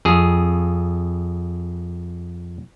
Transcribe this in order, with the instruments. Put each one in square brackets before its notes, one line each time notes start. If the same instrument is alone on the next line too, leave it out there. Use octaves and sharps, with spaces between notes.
[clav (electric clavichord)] F2 G#4